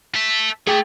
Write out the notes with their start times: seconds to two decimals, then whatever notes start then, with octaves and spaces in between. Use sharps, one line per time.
0.15 A4 E5
0.67 A3 G#4 G5